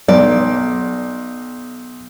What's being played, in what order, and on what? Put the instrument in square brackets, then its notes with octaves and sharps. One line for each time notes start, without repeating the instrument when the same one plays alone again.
[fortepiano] B1 [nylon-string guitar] D5